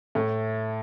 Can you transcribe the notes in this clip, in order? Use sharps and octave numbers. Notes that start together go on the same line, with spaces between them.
A2 A3